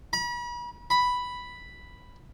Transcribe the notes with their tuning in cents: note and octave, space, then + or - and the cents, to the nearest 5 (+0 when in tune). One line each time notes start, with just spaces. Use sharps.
B5 -40
B5 +0